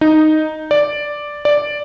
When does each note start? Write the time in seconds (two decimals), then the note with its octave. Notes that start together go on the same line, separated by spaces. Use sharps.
0.01 D#4
0.71 D5
1.45 D5